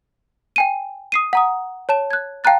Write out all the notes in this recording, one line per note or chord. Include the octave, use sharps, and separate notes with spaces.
G5 G#5 D#7
D#6 C7 D#7
F#5 A#5 D#6
C#5 A5 E7
F#6 G#6
F5 G5 A5 A#5 F#6 A6